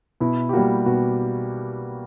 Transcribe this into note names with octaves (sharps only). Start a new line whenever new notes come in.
B2 E4
G4
G3 A#3 F#4
B2 F#4